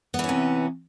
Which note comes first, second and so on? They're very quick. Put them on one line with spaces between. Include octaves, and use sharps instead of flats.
B3 E3 C#4 C3